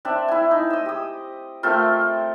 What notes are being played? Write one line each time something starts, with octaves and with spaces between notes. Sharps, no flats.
C4 D4 E5
E4 G#5
D#4
D#5 E6
G4 D#6
A3 C4 F4 A#4